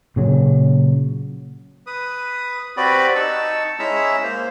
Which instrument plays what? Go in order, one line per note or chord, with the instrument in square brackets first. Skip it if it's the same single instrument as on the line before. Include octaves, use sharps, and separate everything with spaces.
[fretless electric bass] A#2 C#3 F#3
[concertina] B4 D#6
C4 F#4 G4 B4 D5 B5
D#4 A5 C#6 E6
G#3 C#4 E4 E5 A#5 E6
A#3 C5